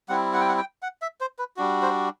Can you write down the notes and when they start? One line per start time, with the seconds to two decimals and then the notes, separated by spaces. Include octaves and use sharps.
0.09 G3 C4 E4 F#5
0.33 F#5
0.41 G5
0.49 F#5
0.58 G5
0.82 F#5
1.02 E5
1.21 C5
1.39 B4
1.57 G3 D4 F#4
1.82 C5